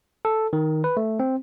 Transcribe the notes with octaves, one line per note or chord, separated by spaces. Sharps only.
A4
D#3
B4
A3
C4